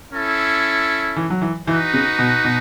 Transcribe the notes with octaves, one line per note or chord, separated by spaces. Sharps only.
C#4 E4 A4
E3
F#3
E3
E3 D#4 F#4 B4
C#3
B2
B2